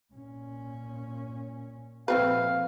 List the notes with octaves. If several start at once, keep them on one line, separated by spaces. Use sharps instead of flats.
A#2 C#4
A#2 F3 A3 C4 B4 F5